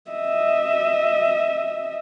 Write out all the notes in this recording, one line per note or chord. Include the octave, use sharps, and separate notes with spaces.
D#5 E5